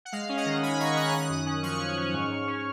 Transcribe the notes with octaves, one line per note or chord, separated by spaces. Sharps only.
F#5
G#3 F5
C#4
D#5 F#5
D#3
G#3 G#5 B5
D#3 A#5 C#6
D#3 D#6 F#6
F6
C#4 D#6 F#6
F#2
C#4
F3 C#6 F6
C#4
C#4
G#2
G#2
C#4